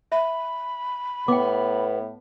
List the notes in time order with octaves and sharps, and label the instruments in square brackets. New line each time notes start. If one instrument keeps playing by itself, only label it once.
[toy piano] E5 [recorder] B5
[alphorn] A2 [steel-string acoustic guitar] B3 [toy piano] G5 D6